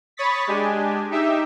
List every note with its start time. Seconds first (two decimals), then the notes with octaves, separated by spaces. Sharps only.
0.17 C#5 B5 C#6 D#6 A6 B6
0.47 G#3 D4 G4 G#5
1.11 D#4 G4 E5